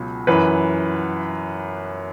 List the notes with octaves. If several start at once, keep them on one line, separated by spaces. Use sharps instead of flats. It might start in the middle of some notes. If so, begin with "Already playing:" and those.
Already playing: C#2 B2 F#3
F#2 E3 B4